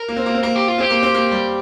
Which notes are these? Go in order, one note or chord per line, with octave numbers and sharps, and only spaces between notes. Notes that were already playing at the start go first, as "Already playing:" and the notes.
Already playing: A#4
A#3
C4
A#3
C4
A#3 A#4
G4
F4
C4 G4
A#3
C4
A#3
G3